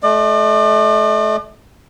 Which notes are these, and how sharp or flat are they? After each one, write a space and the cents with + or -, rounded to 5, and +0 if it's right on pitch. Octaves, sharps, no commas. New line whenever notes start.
A3 -30 D5 +40